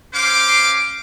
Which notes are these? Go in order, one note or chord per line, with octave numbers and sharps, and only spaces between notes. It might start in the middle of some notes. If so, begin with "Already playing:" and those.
C#4 C5 F5 D6